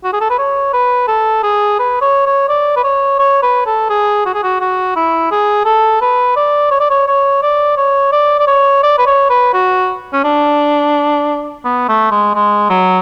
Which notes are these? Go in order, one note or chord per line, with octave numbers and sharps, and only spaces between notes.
F#4
G#4
A4
B4
C#5
B4
A4
G#4
B4
C#5
C#5
D5
B4
C#5
C#5
B4
A4
G#4
F#4
G#4
F#4
F#4
E4
G#4
A4
B4
D5
C#5
D5
C#5
C#5
D5
C#5
D5
D5
C#5
D5
B4
C#5
B4
F#4
C#4
D4
B3
A3
G#3
G#3
F#3